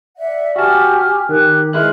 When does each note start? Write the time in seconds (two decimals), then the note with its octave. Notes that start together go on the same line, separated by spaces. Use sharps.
0.17 D5 E5 F#5
0.56 F#4 G4 G#5 A5 F6
1.29 D#3 G4 F#6
1.73 G#3 E4 B4 C6 F6 F#6